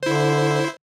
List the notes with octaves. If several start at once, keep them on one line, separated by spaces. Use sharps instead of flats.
D3 E4 C5